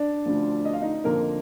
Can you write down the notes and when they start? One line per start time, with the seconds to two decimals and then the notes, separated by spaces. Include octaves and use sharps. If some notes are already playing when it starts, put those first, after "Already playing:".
Already playing: D4 D5
0.26 D2 D3 F3
0.65 D#5
0.73 F5
0.81 D#4 D#5
1.04 F2 D3 F3 A#3 A#4